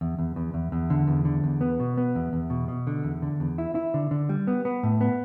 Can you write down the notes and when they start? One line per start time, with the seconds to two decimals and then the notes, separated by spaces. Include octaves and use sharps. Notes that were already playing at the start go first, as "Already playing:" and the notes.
0.01 E2
0.19 E2
0.36 E2
0.54 E2
0.72 E2
0.90 D3
1.08 E2
1.25 D3
1.44 E2
1.61 B3
1.80 B2
1.98 B3
2.15 E2
2.33 E2
2.50 B2
2.68 B2
2.87 D3
3.04 E2
3.22 D3
3.40 E2
3.58 E4
3.75 E4
3.94 D3
4.11 D3
4.29 G3
4.47 B3
4.65 B3
4.83 A2
5.01 B3